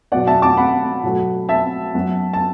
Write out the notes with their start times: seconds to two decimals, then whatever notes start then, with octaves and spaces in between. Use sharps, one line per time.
0.12 B2 F#3 B3 D5 F#5
0.27 E5 A5
0.42 A5 D6
0.57 F#5 B5
1.03 B2 F#3 A3
1.49 E5 A5
1.95 F#2 F#3 B3
2.33 A5